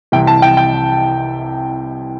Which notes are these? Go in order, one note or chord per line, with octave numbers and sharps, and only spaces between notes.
C2 C3 E3 G5
A5
G5
G5